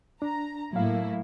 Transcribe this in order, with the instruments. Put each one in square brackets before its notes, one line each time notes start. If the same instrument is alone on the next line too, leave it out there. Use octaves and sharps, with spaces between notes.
[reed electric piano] D4 [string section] A#5
[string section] A2 A#3 E4 [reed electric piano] F#3 F5